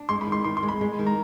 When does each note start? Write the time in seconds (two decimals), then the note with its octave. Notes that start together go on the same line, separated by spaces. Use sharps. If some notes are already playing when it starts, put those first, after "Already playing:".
Already playing: D4
0.09 G#3 C6
0.21 B5
0.27 D#3
0.32 C6
0.44 D#3 C6
0.57 C6
0.63 G#3
0.69 B5
0.81 G#3
0.99 D#3
1.07 A#5